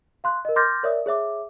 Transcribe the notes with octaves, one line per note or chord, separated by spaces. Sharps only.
F5 C6 F#6
A#4 D#5
C6 D6 F6 G6 A6 A#6
A#4 C#5 D5 E5 D#6
G#4 C#5 E5 D6